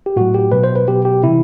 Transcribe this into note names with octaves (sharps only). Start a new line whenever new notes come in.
G4
A2 F#3 F#4
G4
B2 F#3 B4
C5
B4
B2 F#3 G4
G4
C3 E3 E4